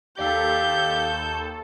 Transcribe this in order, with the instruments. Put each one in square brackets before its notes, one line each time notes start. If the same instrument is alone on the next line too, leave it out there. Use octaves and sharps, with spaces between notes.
[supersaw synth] D#2 A4 [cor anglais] G4 [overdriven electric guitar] D5 F5 [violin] G6